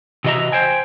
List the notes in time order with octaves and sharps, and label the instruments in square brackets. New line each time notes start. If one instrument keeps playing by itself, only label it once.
[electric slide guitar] C3 E3 F#4 D#5 E5 A#5
C5 G5 G#5